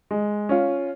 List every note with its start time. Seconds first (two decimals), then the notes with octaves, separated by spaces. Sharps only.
0.11 G#3
0.49 C#4 F4